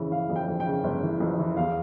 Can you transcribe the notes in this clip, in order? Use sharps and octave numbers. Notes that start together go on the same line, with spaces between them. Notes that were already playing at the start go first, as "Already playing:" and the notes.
Already playing: F2 C#3 E3
E3 F5
F2
G5
F2
G5
C#3
G1
E3
F2
E3
E2 F5